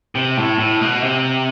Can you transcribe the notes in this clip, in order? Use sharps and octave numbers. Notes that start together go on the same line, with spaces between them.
C3
A2
A2
B2
C3